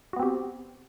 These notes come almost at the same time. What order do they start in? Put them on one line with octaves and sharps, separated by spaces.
F#4 B3 C4 G4